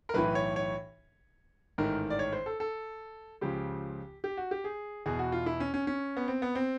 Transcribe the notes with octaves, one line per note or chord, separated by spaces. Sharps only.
A#4
B1 A2 E3 B4
C#5
C#5
A1 G#2 D#3 A#4
D5
C#5
C5
A4
A4
C#2 C#3 F3 G4
G4
F#4
G4
G#4
E2 B2 G#4
F#4
F4
E4
C#4
C#4
C#4
B3
C4
B3
C4